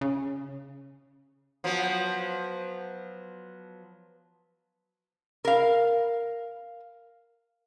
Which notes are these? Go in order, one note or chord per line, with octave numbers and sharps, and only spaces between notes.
C#3
F3 F#3 B3
A#4 F5